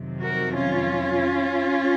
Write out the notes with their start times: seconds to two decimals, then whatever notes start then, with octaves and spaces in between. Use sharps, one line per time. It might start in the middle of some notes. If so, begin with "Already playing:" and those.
Already playing: F2 C3 D#3 F#3
0.21 F#4 A#4
0.53 C#4 F4